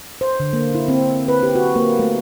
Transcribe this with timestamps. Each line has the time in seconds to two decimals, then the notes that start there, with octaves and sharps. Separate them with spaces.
0.21 C5
0.40 D3
0.53 A#3
0.75 E4
0.88 C4
1.28 B4
1.43 G4
1.55 F#4
1.75 A#3
1.99 A3